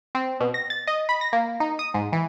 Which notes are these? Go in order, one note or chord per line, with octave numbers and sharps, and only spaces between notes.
C4
B2
A#6
A6
D#5
B5
A#6
A#3
D#4
D#6
G#2
E3